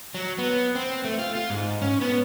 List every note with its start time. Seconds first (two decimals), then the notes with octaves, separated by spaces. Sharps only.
0.14 F#3
0.38 B3
0.75 C4
1.04 A3
1.19 F4
1.35 F4
1.50 G#2
1.82 C#4
2.01 B3